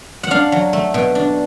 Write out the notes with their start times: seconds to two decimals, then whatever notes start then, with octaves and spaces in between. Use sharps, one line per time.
0.23 F#5
0.31 D4 F5
0.52 F#3
0.73 A3
0.94 B2
1.15 D4